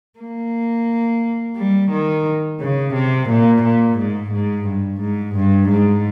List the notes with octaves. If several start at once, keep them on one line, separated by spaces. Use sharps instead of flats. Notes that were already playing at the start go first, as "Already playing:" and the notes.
A#3
G3
D#3
C#3
C3
A#2
A#2
G#2
G#2
G2
G#2
G2
G#2